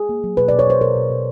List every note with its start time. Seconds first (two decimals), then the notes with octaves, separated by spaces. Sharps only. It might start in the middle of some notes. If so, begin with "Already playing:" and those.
Already playing: G#4
0.09 A#3
0.24 F#3
0.37 B2 B4
0.48 B2 D5
0.59 C#5
0.67 B2 C5
0.81 B2 A#4
0.96 B2
1.10 B2